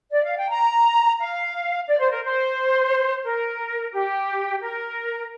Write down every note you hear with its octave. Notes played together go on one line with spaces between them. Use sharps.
D5
F5
G5
A#5
F5
D5
C5
A#4
C5
A#4
G4
A#4